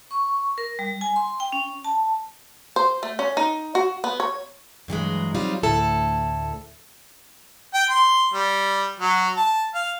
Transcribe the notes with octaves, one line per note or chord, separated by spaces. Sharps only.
C#6
A#4
G3
G#5
C6
G5
C#4
A5
C5
A3
C#4
D#4
F#4
B3
C#5
G2 E3 F#3 G#3
F#3 G3 C4 C#4 D#4 F4
D2 A2 E4 A4
G5
C6
G3
F#3
A5
F5